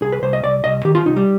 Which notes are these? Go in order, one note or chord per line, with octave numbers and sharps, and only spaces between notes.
C2 G#4
B4
C2 C5
D#5
C2 D5
C2 D#5
D#3 G4
F4
C2 D#4
G3